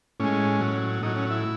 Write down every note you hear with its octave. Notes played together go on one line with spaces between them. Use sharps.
A2 G#3 C#4
A2 F#3
A2 F#3 D#4
C#4
E4